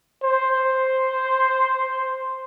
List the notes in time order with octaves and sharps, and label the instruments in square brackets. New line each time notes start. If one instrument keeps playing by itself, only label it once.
[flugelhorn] C5